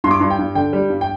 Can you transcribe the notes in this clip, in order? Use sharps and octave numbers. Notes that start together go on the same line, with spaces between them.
G2 C6
D6
G2 C6
G5
G2
D3 G5
G3
G2
G5